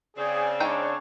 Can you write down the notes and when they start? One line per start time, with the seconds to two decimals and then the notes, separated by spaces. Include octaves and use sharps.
0.17 C#3 C4 G#4 D5
0.60 G#3 D4 D#4 C#5 G5